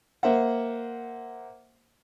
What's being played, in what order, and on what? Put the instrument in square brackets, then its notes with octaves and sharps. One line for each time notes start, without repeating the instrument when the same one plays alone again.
[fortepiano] A#3 C5 E5 F#5